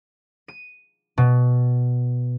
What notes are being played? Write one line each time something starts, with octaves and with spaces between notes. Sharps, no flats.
D#7
B2